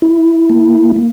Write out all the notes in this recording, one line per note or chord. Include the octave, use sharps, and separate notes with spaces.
E4
A#3
A#3